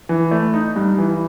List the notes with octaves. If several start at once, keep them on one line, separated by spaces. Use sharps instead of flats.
E3
A3
D#4
G2
E3